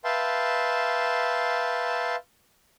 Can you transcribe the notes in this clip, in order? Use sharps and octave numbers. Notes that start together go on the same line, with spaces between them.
B4 E5 F5 G5 A5 C6